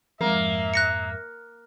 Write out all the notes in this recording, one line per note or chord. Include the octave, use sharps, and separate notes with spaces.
F2 G#2 A#3 E5
F#6 A#6 C#7